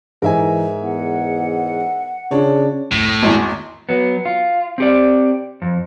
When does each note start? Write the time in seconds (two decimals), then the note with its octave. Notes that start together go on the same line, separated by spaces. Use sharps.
0.22 G#2 E3 A#4 E5 G#5
0.82 E2 F#5
2.31 C#3 D4 F4 C#5
2.91 C2 F#2 A2
3.23 G#1 E2 B3 D#4
3.89 F#3 B3
4.25 F4
4.78 C4 G4 D5
5.62 F2